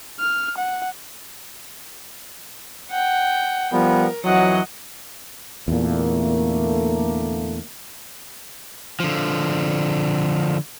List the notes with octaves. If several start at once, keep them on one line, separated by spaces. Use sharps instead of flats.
F6
F#5
F#5 G5
F3 G3 B3 A#4
F2 E3 F#3 D#5 F#5
E2 A#2 D3 A3 A#3
D3 F3